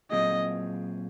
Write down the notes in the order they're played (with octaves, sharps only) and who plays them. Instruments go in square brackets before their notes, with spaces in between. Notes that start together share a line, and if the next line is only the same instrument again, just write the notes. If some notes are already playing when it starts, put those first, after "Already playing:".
[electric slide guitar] A#2 F#3 C4 F4 G#4 [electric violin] D#5